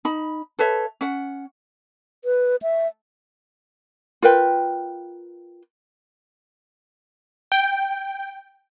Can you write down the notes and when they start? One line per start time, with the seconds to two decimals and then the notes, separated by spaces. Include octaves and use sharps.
0.05 D#4 B5
0.59 A4 B4 C#5 E5
1.01 C#4 F#5
2.25 B4
2.62 E5
4.22 F4 A#4 B4 G5
7.52 G5